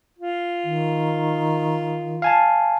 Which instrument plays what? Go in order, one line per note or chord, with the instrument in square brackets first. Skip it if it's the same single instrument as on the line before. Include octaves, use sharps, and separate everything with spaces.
[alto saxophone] F4
[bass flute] D#3
[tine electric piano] F5 G#5 A5